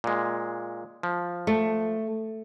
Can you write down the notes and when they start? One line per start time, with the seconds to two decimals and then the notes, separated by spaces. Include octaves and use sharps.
0.04 A#2 G#3
1.03 F3
1.47 A3